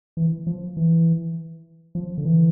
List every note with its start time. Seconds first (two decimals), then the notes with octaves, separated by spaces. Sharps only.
0.17 E3
0.47 F3
0.77 E3
1.95 F3
2.18 D3
2.25 E3